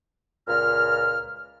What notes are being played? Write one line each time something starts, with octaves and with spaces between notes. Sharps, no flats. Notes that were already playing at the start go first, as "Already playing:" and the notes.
C#2 A#2 F6